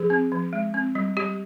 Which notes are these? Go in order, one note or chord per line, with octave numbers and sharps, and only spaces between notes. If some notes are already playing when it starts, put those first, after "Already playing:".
Already playing: F3 G#4
C4
F3
G#3
C4
G3
G3 G4